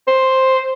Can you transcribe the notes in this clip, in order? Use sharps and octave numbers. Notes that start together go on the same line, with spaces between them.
C5